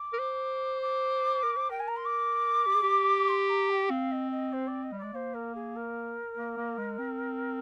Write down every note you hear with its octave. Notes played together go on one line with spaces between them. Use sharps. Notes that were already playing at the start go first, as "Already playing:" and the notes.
Already playing: D6
A#4
C5
D6
A#4
C5
A#4 G5
G#5
A#5
C6
D6
G4
G#4
G4
C6
A#5
G5
C4 F5
D#5
D#5
C5
D5
D#5
G3
D5
G#3
A#3 C5
A#4
G#4
A#4
A#3
A#3
G#3
C4